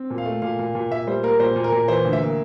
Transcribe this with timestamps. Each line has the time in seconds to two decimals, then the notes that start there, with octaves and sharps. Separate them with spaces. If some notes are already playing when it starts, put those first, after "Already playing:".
Already playing: C4
0.10 A#2
0.18 F5
0.26 A3
0.42 A#2 F5
0.59 A#2
0.75 A#2
0.91 A#2 E5
1.07 G3 C5
1.23 A#3 A#4
1.39 A#2 C5
1.56 A#2
1.64 A#4
1.72 A#2
1.88 E3 C5
2.05 D2
2.13 E5
2.21 A#3